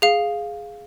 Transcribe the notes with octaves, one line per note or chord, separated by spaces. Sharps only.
G#4 F5